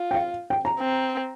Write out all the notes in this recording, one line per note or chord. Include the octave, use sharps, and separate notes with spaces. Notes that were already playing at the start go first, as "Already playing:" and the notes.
Already playing: F4
G5
F5
G5
A#5
C4